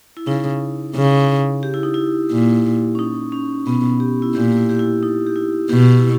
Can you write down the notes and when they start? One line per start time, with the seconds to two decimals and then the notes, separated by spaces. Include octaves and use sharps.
0.17 E4
0.27 C#3 D#4
0.95 C#3
1.63 G4
1.74 E4
1.83 D#4
1.94 E4
2.32 A#2
2.95 C#4
2.99 D#4
3.32 C#4
3.66 B2 B3
4.00 G4
4.22 E4
4.35 A#2 G4
4.52 G4
4.57 E4
4.69 G4
4.79 E4
5.03 D#4
5.27 G4
5.36 E4
5.69 B2 G4
5.99 E4